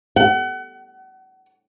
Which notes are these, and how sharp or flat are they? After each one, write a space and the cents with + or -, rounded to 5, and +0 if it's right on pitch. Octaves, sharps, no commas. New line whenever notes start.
F#5 +35